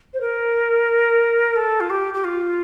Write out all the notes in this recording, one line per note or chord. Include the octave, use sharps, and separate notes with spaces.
C5
A#4
A4
F4
G4
G4
F4